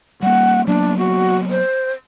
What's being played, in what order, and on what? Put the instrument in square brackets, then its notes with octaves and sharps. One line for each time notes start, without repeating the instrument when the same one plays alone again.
[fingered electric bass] G3 A#3 [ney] F#5
[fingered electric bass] F#3 A#3 B3 [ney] D4
[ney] F#4
C5